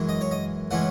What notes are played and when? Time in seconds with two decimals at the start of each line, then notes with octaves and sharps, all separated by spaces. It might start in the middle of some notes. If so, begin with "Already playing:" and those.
Already playing: F#2 E3 G#3
0.09 D#5
0.21 C#5
0.31 D#5
0.71 A2 E3 G#3 C#4 F#5